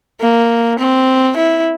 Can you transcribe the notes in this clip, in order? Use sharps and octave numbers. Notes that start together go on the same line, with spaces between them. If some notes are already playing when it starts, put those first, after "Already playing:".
A#3
C4
E4